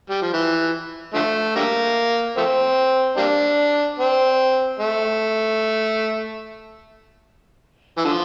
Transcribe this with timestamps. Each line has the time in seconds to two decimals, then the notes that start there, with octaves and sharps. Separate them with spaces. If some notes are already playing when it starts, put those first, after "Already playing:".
0.10 G3
0.22 F3
0.33 E3
1.14 D3 F3 A3
1.56 D3 G3 A#3
2.37 F3 A3 C4
3.17 G3 A#3 D4
3.99 C4
4.79 A3
7.98 E3
8.04 D3 F3